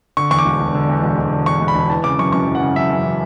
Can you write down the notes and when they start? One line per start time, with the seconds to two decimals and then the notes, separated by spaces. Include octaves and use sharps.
0.17 D3 C#6
0.31 E2 C#6
0.39 D6
0.45 E1
0.61 E1
0.75 D3
0.89 E2
1.03 E1
1.18 E1
1.33 D3
1.46 E2 C#6
1.61 E1
1.68 B5
1.75 E1
1.90 E3 A5
2.04 C#3 D6
2.19 F#2 C#6
2.32 F#2 C#6
2.48 E3
2.55 F#5
2.62 C#3
2.76 F#2 E5
2.91 F#2
3.05 E3